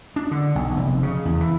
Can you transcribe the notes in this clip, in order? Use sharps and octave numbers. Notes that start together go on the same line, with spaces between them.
D4
D3
B1
F1
C#3
E2
E3